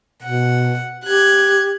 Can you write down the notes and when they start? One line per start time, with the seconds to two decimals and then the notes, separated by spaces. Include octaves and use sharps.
0.23 B2 F#5
1.05 G4 F#6 G#6